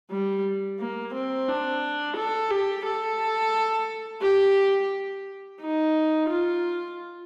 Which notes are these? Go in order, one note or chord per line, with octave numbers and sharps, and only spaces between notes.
G3
A#3
C4
D4
A4
G4
A4
G4
D#4
F4